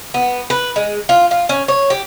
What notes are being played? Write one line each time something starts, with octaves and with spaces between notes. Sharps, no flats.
B3
B4
G#3
F4
F4
C#4
C#5
G4